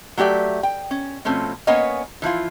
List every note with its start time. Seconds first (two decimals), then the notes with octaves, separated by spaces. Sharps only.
0.17 F#3 A3 G4 D5 E5
0.63 G5
0.91 C#4
1.25 B2 F3 A3 C4 C#4
1.67 A#3 B3 C#4 C#5 D#5 G#5
2.22 E3 F3 E4 F4